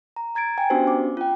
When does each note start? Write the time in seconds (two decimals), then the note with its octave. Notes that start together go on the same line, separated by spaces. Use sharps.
0.16 A#5
0.35 A#5 G#6 A6 D7
0.58 G5 G#5
0.70 B3 C#4 D4 F#4 G4 C5
0.87 D6
1.17 F4 G5